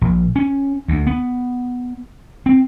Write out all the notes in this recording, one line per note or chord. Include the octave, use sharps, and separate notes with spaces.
A#1
C#4
D2
B3
C4